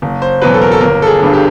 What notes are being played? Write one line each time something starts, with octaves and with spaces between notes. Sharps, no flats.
F#1
C5
E2 B2 F#3 B4
A4
A#4
A4
G1 A#4
A4
G#4
G2 D3
G4